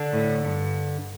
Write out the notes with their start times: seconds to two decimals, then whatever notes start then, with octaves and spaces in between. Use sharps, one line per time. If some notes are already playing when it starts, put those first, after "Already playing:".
Already playing: D3 D4
0.11 A2
0.45 G2